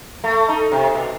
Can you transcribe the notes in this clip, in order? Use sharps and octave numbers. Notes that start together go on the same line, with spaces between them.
A3
D#4
C3
B2